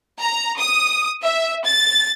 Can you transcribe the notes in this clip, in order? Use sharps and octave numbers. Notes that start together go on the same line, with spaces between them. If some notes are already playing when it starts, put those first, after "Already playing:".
A#5
D#6
E5
A6